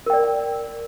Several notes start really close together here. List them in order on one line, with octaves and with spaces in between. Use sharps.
A#4 G5 D5